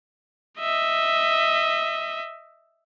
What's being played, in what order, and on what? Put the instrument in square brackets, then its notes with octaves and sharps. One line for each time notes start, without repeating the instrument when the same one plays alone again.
[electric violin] D#5 E5